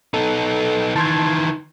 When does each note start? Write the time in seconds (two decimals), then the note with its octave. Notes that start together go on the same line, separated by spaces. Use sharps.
0.14 B3 D#4 A4
0.96 D#3 E3 A5 C6 G#6